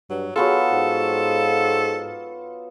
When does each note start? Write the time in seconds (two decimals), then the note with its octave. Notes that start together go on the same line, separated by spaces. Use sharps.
0.10 G2 F#3
0.36 F#3 B3 F4 G#4 A4
0.72 G#2